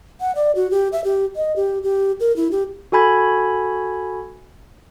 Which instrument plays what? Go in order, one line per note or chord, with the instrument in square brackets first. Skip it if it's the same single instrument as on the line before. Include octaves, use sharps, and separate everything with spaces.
[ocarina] F#5
D5
F#4
G4
E5
G4
D#5
G4
G4
A#4
E4
G4
[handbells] F#4 A4 G#5 B5 G#6